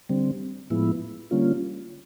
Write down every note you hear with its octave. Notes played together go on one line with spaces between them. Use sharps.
D3 G3 C4
A2 F3 G#3 B3 E4
D3 G3 A#3 C#4 F4